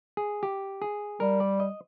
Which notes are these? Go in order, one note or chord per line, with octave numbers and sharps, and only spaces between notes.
G#4
G4
G#4
G3 A#4
D5
D#5